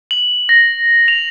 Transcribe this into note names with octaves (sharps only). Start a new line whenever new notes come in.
F#7
A#6
F7